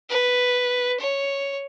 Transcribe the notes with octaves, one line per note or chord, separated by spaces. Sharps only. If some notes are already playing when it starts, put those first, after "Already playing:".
B4
C#5